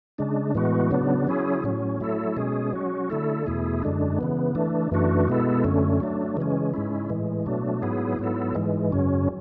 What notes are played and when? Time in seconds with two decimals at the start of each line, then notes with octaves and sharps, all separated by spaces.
0.18 C#3 G#3 D4
0.55 A2 E3 G#3 B3 F#4
0.91 C#3 F#3 B3 D4
1.27 F#3 C#4 E4 G#4
1.64 A2 F#3 C#4
2.00 F#3 A3 E4 A4
2.37 B2 G#3 C#4 G#4
2.73 F#3 C#4 F#4
3.10 D3 A3 E4 A4
3.46 E2 B2 A3 E4 G#4
3.82 F#2 D3 G#3 D4
4.18 C#3 E3 B3
4.55 E3 A3 D4
4.91 F#2 E3 A3 D4 F#4
5.28 B2 G#3 B3 E4 A4
5.64 F#2 D3 A3 C#4
6.00 F#3 A3 D4
6.37 C#3 E3 G#3 C#4
6.74 G#2 G#3 C#4 E4
7.10 A2 E3 G#3
7.46 B2 F#3 A3 D4
7.82 G#2 F#3 B3 E4 G#4
8.19 G#2 F#3 B3 E4 A4
8.55 G#2 E3 G#3
8.92 F#2 C#3 F#3 C#4